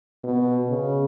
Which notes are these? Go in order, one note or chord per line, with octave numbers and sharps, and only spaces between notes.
B2
C#3